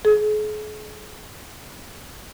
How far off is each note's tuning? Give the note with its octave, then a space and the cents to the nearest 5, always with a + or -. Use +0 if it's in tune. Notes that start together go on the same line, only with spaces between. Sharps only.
G#4 +45